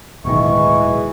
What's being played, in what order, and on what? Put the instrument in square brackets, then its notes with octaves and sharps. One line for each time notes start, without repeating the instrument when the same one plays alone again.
[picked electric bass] D1 B2 D#3 [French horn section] E3 G#3 [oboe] C#6